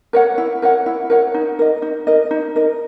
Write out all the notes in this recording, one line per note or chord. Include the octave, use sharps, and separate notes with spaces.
A#4 C#5 F#5
E4
A#4 C#5 F#5
E4
A#4 C#5 F#5
D#4
A#4 D#5
D#4
A#4 D#5
D#4
A#4 D#5